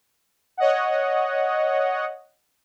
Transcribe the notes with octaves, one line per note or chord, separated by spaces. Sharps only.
C#5 D#5 F#5